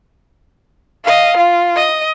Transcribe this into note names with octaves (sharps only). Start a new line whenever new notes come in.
D#5 F5
F4
D#5